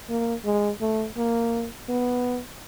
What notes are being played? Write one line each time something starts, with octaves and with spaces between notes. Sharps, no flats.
A#3
G#3
A3
A#3
B3